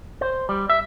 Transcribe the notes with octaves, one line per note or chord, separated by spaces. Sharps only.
C5
G3
E5